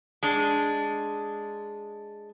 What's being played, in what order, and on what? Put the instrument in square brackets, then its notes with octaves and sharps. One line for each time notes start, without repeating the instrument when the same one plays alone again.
[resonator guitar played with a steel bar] G#3 D4